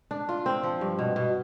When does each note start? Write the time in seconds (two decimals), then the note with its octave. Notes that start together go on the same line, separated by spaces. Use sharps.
0.11 D4
0.29 F4
0.46 C4
0.63 F3
0.81 G2
0.99 B2
1.16 B2